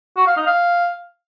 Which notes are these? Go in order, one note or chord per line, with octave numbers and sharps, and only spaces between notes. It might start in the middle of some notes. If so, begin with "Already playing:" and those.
F#4
F5
D#4
F5